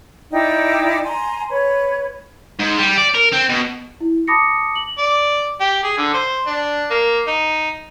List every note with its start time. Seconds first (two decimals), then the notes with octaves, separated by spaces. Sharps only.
0.32 D#4 E4 D5 G5
1.03 G#5 A#5 C6
1.49 B4 C#5
2.59 G#2
2.78 G3
2.98 D5
3.15 A#4
3.33 C4
3.50 B2
4.00 E4
4.27 A5 B5 D6 D#6 A#6 C#7
4.75 F#7
4.98 D5
5.60 G4
5.83 G#4
5.98 D3
6.14 C5
6.46 D4
6.91 A#3
7.27 D#4